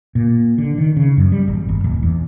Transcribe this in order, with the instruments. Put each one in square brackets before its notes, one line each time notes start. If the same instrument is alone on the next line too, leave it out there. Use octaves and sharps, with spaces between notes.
[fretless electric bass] A#2
D3
D#3
C#3
F#2
G3
G#1
G1
D#1
E2